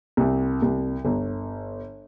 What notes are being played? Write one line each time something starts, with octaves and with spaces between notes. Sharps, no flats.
C2
C2
G1